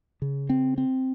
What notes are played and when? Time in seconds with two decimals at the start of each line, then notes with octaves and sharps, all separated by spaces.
0.22 C#3
0.50 C4
0.78 C4